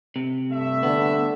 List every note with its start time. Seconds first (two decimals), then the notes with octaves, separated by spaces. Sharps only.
0.16 C3
0.52 G2 A3 E5
0.83 D3 B3